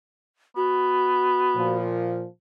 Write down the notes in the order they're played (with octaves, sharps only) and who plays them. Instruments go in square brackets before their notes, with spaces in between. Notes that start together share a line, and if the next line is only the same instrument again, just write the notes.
[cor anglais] B3 [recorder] F#4
[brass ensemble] A#2 F3